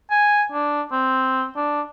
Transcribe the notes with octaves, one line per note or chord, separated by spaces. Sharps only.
G#5
D4
C4
D4